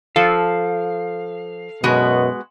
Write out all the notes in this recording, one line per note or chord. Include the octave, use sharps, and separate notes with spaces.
F3 A4 F5
F#2 B2 G#3 B3 F#4